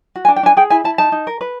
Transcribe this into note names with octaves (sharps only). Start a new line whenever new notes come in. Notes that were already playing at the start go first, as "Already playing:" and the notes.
F#4
G#5
D4
G5
D4 G#5
G#4 G5
E4 G#5
E4 A5
D#4 A5
D#4
A#4
B4